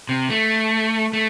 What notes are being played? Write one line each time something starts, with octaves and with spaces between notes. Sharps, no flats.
C3
A3
A3